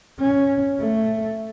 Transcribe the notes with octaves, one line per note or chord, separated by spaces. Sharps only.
C#4
A3